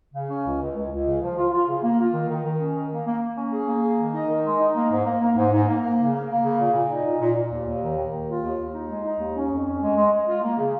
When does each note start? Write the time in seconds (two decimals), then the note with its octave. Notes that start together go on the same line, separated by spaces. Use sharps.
0.14 C#3
0.30 C#4
0.45 C#2
0.61 C#2
0.76 C#2
0.91 C#2
1.07 C#3
1.22 F3
1.37 F4
1.52 F4
1.68 C#3
1.83 A#3
1.99 F4
2.13 D#3
2.29 D#3
2.45 D#3
2.59 C#4
2.75 D#3
2.91 A#3
3.06 A#3
3.21 A#3
3.37 C#4
3.52 G#4
3.67 A#3
3.82 G#4
3.97 D#3
4.13 D#4
4.29 D#3
4.44 G#3
4.60 D#4
4.74 A#3
4.90 G#2
5.05 A#3
5.21 A#3
5.36 G#2
5.52 G#2
5.67 A#3
5.82 A#3
5.98 C#3
6.13 A#3
6.29 A#3
6.44 C#3
6.59 A#2
6.74 A#2
6.89 D#4
7.05 A#2
7.21 A#2
7.35 A#2
7.52 D#2
7.66 D#2
7.82 D#3
7.97 D#3
8.12 D#2
8.27 F4
8.43 D#2
8.59 D#2
8.73 D#4
8.89 G#3
9.04 D#4
9.19 D#2
9.36 C#4
9.51 F2
9.66 C#4
9.82 G#3
9.96 G#3
10.12 G#3
10.28 F4
10.42 A#3
10.58 C#3